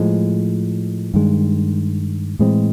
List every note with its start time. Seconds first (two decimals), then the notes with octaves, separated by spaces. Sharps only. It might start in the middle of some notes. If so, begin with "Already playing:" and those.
Already playing: A2 F3 G#3
1.14 G2 D#3 G#3
2.39 A2 E3 G#3 C4